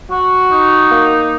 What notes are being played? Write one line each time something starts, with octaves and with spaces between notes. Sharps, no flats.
F#4
D#4
A#3